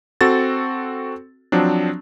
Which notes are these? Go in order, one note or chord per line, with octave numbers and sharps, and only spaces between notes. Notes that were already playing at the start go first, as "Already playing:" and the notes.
C4 F#4 A4 A6
F3 F#3 C4 D4